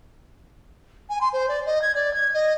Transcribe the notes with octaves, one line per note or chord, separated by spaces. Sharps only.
G#5
C6
C5
D5
D#5
G#6
D5
G#6
D#5